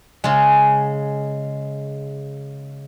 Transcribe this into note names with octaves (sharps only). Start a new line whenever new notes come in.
C#3 G#3